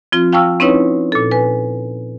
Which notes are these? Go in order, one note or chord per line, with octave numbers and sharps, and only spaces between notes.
F3 C4 F4
F5 G5 A5 C#6 E6 F6
C4 C#4 D#4 E4 B4 C#5
A#2 A4
B4 G#5